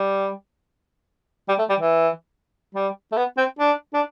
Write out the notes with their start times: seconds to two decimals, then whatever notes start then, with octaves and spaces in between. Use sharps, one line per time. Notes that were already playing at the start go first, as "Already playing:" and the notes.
Already playing: G3
1.49 G3
1.59 A3
1.69 G3
1.80 E3
2.75 G3
3.12 A3
3.17 B3
3.37 C4
3.59 D4
3.94 D4